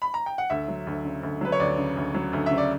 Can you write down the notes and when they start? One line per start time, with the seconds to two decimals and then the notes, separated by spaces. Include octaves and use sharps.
0.02 B5
0.14 A#5
0.26 G5
0.38 F#5
0.50 D2 E5
0.68 F#3
0.87 D2
1.05 C#3
1.23 D2
1.41 F#3 B4
1.52 C#5
1.60 D2 D5
1.78 C#3
1.97 D2
2.14 F#3
2.33 D2
2.46 C#3 E5
2.58 D5